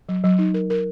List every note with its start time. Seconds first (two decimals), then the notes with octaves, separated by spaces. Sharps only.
0.09 F#3
0.24 F#3
0.39 D#4
0.54 A#4
0.70 A#4